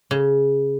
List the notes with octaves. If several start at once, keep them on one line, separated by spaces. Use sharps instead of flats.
C#3